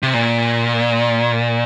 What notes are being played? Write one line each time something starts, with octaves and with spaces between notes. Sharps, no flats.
C3
A#2